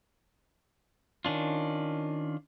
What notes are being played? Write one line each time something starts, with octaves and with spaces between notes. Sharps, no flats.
D#3 C#4 D4 F4